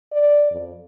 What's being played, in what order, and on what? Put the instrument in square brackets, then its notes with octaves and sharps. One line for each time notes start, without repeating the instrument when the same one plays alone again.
[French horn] D5
F2